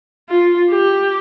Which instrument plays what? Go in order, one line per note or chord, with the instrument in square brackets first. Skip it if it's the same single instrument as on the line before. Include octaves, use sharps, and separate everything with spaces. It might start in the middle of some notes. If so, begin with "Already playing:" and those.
[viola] F4
G4